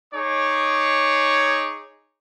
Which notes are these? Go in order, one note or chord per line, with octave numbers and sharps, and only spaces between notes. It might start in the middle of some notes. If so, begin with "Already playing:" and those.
D#4 G#4 C#5 D6